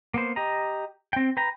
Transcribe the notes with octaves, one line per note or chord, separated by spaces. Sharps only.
A#3 B3 C5
G4 D#5 A#5
C4 G5
B4 G5 A#5